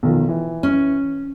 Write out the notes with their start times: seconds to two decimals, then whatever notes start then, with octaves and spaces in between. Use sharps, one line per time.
0.03 B1 D#3 F3
0.29 E3
0.63 C#4